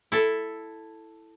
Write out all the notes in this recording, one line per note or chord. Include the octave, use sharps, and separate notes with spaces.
E4 A4